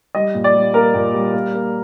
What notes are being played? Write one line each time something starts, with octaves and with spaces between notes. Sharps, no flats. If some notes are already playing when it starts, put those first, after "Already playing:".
G3 D#5
A#2
D5
G3
A#3 A#4
A#2
G3
A#3
A#3